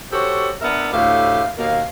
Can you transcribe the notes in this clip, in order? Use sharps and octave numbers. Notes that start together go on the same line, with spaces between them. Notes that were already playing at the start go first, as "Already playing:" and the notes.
F#4 G4 A4 C5 C#5
B3 D4 A#4 E5
D2 A2 G4 E5 F5
D#2 B2 A#3 A#4 F5